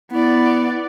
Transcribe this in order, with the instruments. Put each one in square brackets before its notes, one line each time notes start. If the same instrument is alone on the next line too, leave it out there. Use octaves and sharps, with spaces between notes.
[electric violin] B3 D5 [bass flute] E4